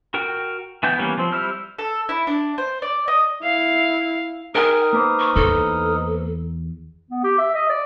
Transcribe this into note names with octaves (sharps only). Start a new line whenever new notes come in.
F#4 A#4 G5
E3 B3 G5 G6
E3 G3 A#3 B3 C#4
F3 C4
G3 E4 C5 E6 F6
A4
E4
D4
C5
D5
D#5
E4 F5
D#4 G#4 A#4 G5 D#6 F6
A#3 B4 C5
C#6
E2 A4
B3
G4
E5
D#5
D5